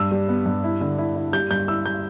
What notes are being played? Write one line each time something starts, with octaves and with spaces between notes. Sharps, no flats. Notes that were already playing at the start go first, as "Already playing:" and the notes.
Already playing: G2 E6
G3
B3
G2
E4
D3
E4
E4
G3 G6
G2 G6
E4 E6
G3 G6